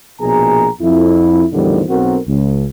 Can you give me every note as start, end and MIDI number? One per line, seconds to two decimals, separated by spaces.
0.21 0.68 34
0.21 0.68 47
0.21 0.68 68
0.21 0.68 80
0.21 0.68 82
0.82 1.46 41
0.82 1.46 64
1.53 1.83 40
1.53 1.83 45
1.53 1.83 50
1.53 1.83 51
1.53 1.83 53
1.53 1.83 55
1.89 2.19 35
1.89 2.19 60
1.89 2.19 66
1.89 2.19 70
2.28 2.66 37